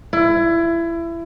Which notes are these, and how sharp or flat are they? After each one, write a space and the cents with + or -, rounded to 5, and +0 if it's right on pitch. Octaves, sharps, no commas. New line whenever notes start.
E4 +25